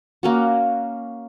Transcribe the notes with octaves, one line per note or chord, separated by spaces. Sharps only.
A#3 C#4 F#4